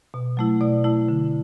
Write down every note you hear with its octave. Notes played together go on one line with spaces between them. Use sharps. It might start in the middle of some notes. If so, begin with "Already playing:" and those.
B2
F#3 A3 E4
B2 D5
A3 E4
D3